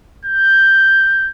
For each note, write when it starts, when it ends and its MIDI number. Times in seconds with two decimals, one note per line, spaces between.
0.25 1.31 91